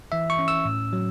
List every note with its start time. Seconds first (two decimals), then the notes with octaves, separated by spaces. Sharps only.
0.12 E3 E5
0.30 C#6
0.39 C#4
0.48 E6
0.65 A2
0.93 F#3